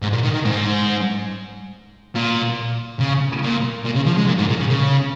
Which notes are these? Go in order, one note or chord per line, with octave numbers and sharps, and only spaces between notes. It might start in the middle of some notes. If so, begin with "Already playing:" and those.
G#2
A#2
D#3
D#3
G#2
A#2
C#3
A#2
A#2
C#3
F3
G#3
A#2
G#2
A#2
C#3
C#3